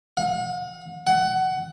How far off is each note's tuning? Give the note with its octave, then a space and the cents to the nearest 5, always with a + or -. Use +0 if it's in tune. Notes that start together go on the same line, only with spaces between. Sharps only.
F#5 -45
F#5 +20